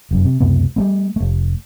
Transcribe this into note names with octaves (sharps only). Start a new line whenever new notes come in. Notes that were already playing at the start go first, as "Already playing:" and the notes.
F1 F#2
C3
C#2 F#2 C3 B3
G3 A3 B3
F1 A3